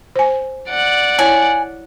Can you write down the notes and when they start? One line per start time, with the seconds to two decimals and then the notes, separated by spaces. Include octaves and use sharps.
0.16 C5 G#5
0.70 D5 F#5
1.19 E4 C#5 G#5 A5